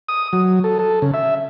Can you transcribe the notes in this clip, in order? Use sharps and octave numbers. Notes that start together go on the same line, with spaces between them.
D#6
F#3
A4
A4
C#3
E5